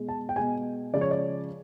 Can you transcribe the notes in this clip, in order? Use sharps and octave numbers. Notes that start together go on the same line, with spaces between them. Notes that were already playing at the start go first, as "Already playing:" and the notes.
Already playing: B2 G#3
A5
G5
B2 G#3 G#5
C#3 F3 G#3 D5
C#5
D5